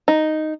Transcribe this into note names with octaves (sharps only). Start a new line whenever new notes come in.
D#4